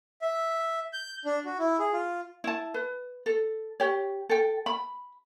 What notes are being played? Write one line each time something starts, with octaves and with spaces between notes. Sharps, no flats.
E5
G6
D4
F#4
E4
G#4
F4
E4 A5
B4
A4
G4 C#5
A4 G5
B5